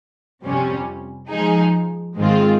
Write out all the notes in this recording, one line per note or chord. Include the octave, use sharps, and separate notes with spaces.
F2 C3 G3 C#4
F3 G#3 D#4 G#4
G#2 D#3 G#3 C4 F4